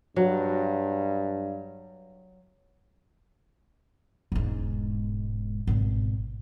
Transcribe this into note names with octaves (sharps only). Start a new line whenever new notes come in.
G2 F#3
E1 G#2
G#1 B2